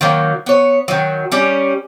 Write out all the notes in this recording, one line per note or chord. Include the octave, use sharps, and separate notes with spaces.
D#3 F#3 A#3
B3 C#5
D#3 F#3
G3 C#4